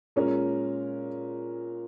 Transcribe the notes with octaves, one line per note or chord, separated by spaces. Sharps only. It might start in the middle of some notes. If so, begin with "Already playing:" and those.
A#2 G#3 C#4 A#4